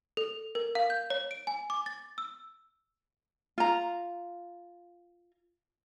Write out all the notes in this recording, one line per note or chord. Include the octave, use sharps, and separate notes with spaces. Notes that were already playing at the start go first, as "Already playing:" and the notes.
A4
A#4
F5
G6
C#5
D7
G#5
D6
A6
E6
F4 A#5